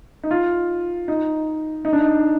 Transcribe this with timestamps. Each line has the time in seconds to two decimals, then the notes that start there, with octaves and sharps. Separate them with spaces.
0.23 D#4
0.31 F4
1.08 D#4
1.85 D#4
1.93 D4
2.00 D#4